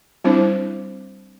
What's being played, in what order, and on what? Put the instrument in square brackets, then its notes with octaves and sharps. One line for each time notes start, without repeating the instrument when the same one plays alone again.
[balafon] G3 C4 D4 E4 C5